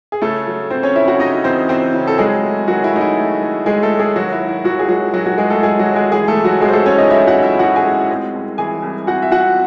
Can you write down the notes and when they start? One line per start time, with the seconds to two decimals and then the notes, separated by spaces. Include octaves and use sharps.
0.12 G#4
0.21 C#3 A3 A4
0.47 F#3
0.70 C#3 C4 C5
0.83 C#4 C#5
0.95 C#3 E4 E5
1.08 F#4 F#5
1.20 C#3 D#4 D#5
1.44 E2 C4 C5
1.69 E2 C4 C5
1.95 C#3
2.07 A4
2.18 F#3 G#3 G#4
2.44 A3
2.67 D#3 F#3 F#4
2.84 E4
2.93 A3 D#4
3.01 E4
3.17 A3
3.42 A3
3.66 G#3 A3 G#4
3.82 A3 A4
3.91 F#3
3.99 G#3 G#4
4.16 D#2 F#3 F#4
4.32 E4
4.41 D#3
4.48 E4
4.64 D#2 F#3 F#4
4.79 G#4
4.89 F#3 G#3 F#4
5.13 D#3 F#3 F#4
5.26 F#3 F#4
5.38 G#3 G#4
5.50 A3 A4
5.63 G#3 G#4
5.79 F#3 F#4
5.87 D#2
5.96 G#3 G#4
6.12 E3 G#3 G#4
6.28 A3 A4
6.36 E3
6.45 F#3 F#4
6.61 A1 G#3 G#4
6.69 C5
6.73 A3 A4
6.86 G#3 C#4 C#5
6.98 D#4 D#5
7.10 G#3 E4 E5
7.26 F#4 F#5
7.35 A2
7.43 E4 E5
7.59 A1 F#4 F#5
7.76 G#4 G#5
7.84 G#3
8.10 C4
8.34 C2
8.58 E3 G#4 G#5
8.83 C2
9.07 C4 F#4 F#5
9.22 E5
9.31 C4 F#4 F#5